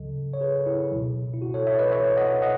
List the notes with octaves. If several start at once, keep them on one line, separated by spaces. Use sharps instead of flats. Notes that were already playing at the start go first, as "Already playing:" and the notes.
Already playing: C#2 C#3 F#3 A4 D#5
C#5
G#4 B4
A4
E4 G#4
C#2 B2 F#3
E4
F#4
A4 C#5
C#5 E5
B4 D#5
C#5 E5
D#5 F#5
D#5 F#5